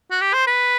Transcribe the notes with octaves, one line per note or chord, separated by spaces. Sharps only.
F#4
G4
C5
B4